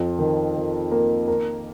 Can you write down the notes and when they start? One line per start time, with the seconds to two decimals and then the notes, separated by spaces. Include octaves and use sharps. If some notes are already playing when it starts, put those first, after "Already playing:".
Already playing: F2
0.19 D#3
0.56 D#3
0.91 A#3
1.28 A#4